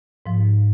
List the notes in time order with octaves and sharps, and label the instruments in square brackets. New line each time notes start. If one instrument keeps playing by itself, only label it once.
[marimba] G#2 F3